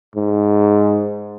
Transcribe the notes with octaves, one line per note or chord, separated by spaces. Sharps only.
G#2